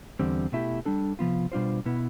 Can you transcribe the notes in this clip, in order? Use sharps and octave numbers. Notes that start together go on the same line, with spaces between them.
E2 D3 G3 C4
B2 A3 E4 G4
G3 D4 A4
C3 F3 B3 F4
B2 G3 D4 F4 C5
B2 B3 E4